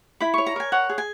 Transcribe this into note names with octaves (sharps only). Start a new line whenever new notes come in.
E4 B5
C#5 C#6
A#5
A#4 G#5
C#5 F#5
G#4
G#5